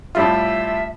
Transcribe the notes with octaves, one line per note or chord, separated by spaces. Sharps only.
A2 G3 F4 E5